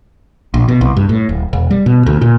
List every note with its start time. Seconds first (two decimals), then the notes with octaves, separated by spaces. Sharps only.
0.54 A#1
0.68 B2
0.81 C2
0.97 G2
1.09 A2
1.29 D1
1.53 E1
1.70 G3
1.86 B2
2.06 D2
2.21 A#2